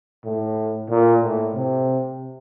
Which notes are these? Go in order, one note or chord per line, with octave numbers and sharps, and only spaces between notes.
A2
A#2
A2
C3